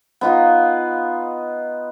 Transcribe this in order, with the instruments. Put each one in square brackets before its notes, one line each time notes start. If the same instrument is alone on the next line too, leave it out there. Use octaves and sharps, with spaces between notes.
[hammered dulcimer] B3 D#4 F4